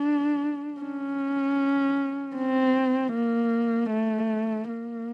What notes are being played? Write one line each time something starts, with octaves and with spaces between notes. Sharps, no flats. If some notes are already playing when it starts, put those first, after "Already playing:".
Already playing: D4
C#4
C4
A#3
A3
A#3